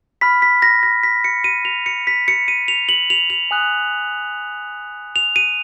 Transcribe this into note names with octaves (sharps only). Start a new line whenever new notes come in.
B5 F6 B6
B6
A#6
A#6
B6
C#7
D#7
F7
C#7
B6
C#7
D#7
F7
F#7
F7
F7
G#5 D#6 F#6
F7
D#7